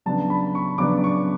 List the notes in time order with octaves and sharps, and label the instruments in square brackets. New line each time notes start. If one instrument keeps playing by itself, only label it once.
[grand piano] C#3 F#3 B3 D4 A5
B5
C#6
C#3 F#3 B3 D4 D6
C#6